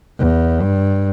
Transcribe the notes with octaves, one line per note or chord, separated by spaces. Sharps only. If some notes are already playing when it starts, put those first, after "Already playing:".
E2
G2